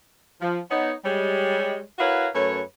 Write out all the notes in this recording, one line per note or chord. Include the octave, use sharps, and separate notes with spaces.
F3
B3 D#4 C#5
G3 G#3 C#5
E4 F#4 A#4 B4 C#5 F5
F#2 A3 B4 C#5